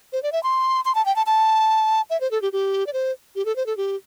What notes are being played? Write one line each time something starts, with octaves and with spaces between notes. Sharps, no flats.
C5
D5
E5
C6
C6
A5
G5
A5
A5
E5
C5
A4
G4
G4
D5
C5
G4
A4
C5
A4
G4